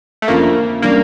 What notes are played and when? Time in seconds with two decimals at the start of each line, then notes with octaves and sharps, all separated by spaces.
0.22 A3
0.28 F2 D3 F3 A#3 C#4
0.82 D3 G3 A#3 C#4